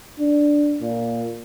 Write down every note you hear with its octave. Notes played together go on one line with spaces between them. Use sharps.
D4
A#2